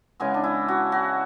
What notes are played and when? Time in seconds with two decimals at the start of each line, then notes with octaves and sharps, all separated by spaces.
0.20 C#3 E3 G#3 B3 G#4
0.34 D4
0.44 E4
0.68 F#4
0.92 F#4